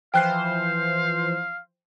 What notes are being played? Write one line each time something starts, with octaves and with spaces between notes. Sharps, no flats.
E3 F3 C5 F5 G5 F#6 C7